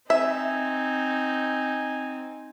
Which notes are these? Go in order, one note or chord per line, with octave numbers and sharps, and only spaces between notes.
C4 D#4 E5 G#5